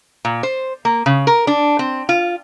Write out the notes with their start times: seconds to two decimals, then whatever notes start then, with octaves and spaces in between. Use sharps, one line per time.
0.25 A#2
0.43 C5
0.85 A#3
1.06 C#3
1.27 A#4
1.47 D4
1.79 C4
2.09 F4